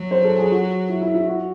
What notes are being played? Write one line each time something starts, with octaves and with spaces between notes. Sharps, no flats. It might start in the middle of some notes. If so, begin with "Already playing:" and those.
Already playing: F#3
C5
A4
G#4
F#4
E4
E4
E4
F#4